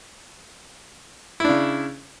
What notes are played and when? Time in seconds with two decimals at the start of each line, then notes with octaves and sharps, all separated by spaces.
1.40 E4
1.45 D4
1.49 C#3